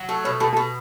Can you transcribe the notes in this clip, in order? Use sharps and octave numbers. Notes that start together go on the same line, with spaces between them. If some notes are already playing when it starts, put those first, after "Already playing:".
Already playing: F#3
A3 A4
B2 C#5
B2 A4
A4
B2